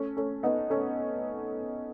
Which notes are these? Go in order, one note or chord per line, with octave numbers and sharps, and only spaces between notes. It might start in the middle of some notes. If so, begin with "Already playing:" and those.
Already playing: A3 C#4
A3 C#4
B3 D#4
A3 C#4